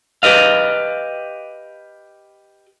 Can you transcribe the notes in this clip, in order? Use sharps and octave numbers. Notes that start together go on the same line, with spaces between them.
G4 B4 D#5 F5